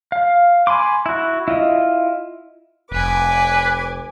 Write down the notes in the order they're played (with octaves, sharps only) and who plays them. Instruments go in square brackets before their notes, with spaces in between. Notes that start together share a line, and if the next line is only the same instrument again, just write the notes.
[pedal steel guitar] F5
G#5 B5 C6 D6
E4 F#4
E4 F4 D#5
[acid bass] F1 [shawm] B4 [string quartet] G#5 D6